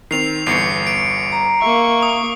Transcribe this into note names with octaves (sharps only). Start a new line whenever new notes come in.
D#3 C4 C7 F7
G1 E2 C7 C#7
D7
A#5
A#3 E5 C#6
D#6